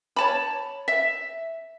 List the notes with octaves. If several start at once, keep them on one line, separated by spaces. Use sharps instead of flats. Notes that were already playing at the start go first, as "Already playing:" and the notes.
C#5 A5 B5
E5